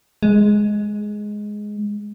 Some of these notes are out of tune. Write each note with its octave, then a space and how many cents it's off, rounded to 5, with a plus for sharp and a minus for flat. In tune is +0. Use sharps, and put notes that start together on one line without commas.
G#3 +5